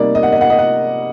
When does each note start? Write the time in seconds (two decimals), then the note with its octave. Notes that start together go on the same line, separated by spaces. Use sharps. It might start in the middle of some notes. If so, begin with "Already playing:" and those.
Already playing: C3 G3 A#3 D#4 D5
0.15 D#5
0.23 F#5
0.32 D#5
0.41 F#5
0.50 D#5
0.59 F#5